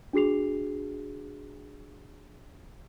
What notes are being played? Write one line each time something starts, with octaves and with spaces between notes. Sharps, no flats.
D4 F#4 G#4 C7 F7